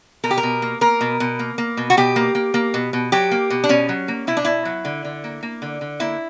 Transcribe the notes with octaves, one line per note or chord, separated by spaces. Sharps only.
B2 A#4
G4
A#4
B2
A#3
A#3 A#4
B2
B2
A#3
A#3
B2
F#4
B2 G4
A#3
A#3
A#3
B2
B2
F#3 G4
A#3
B2
D4
B2 C#4
F#3
A#3
B2 E4
D4
B2 E4
F#3
D3
D3
A#3
A#3
D3
D3
A#3 E4